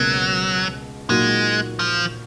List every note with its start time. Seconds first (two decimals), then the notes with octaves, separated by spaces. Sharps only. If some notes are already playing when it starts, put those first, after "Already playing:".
Already playing: C#2 B2 F#3 A#3
1.09 A#2 F#3 G#3 A#3 D#4 F#4
1.79 F3